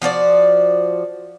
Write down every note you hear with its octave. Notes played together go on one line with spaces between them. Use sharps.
F3 F#4 C#5 D5